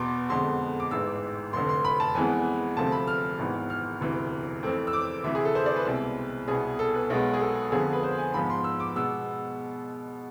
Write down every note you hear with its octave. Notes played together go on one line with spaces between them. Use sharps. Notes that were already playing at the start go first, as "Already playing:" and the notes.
Already playing: E2 B2 B3 C6 D6
F2 D3 G#3 B3 C6
D6
A1 G#2 G#3 E6
F1 F2 D3 C6
C6
B5
A5
F2 E3 G#3 B3 G#5
D2 C3 F3 A3 C4 A5
B5
F6
G#1 G#2 E3 B3
F6
E1 D2 C3 E3
F2 E3 A3 C4
E6
D6
D2 C3 E3 E5
G#4
A4
C5
D5
B4
C2 B2 G#3 C4
C2 B2 B3 G#4
A4
B4
B1 B2 G#3 B3
G#4
A4
F2 D3 F3 B3 G#4
B4
C5
G#5
G#2 F3 B3 B5
C6
E6
D6
B2 G#3 B3 E6